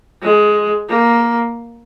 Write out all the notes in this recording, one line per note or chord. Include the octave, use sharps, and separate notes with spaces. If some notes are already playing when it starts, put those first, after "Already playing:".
G#3
A#3